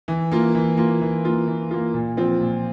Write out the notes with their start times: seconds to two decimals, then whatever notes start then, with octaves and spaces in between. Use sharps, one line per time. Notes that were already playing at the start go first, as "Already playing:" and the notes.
0.08 E3
0.31 A#3 F4
0.55 E3
0.77 A#3 F4
1.01 E3
1.25 A#3 F4
1.47 E3
1.71 A#3 F4
1.94 A#2
2.17 F3 C4 F4
2.41 A#2